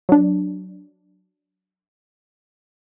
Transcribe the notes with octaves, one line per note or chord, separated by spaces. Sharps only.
F#3 D4